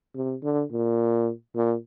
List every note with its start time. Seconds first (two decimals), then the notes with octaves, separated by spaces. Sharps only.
0.15 C3
0.43 D3
0.71 A#2
1.56 A#2